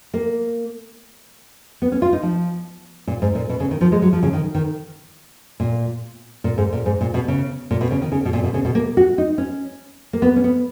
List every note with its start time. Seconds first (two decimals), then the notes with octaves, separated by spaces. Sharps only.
0.14 A#3
1.82 B3
1.92 C#4
2.02 F4
2.13 D#4
2.23 F3
3.07 A#2
3.22 G#2
3.35 A#2
3.49 B2
3.60 C#3
3.71 D#3
3.81 F3
3.92 G#3
4.02 F#3
4.13 F3
4.23 C#3
4.33 D#3
4.55 D#3
5.60 A#2
6.44 A#2
6.58 G#2
6.73 A#2
6.86 G#2
7.01 A#2
7.14 B2
7.28 C#3
7.71 A#2
7.81 B2
7.91 C#3
8.02 D#3
8.12 C#3
8.25 B2
8.33 A#2
8.44 B2
8.54 C#3
8.65 B2
8.75 A#3
8.97 F#4
9.18 D#4
9.38 C#4
10.13 A#3
10.22 B3
10.36 C#4
10.44 B3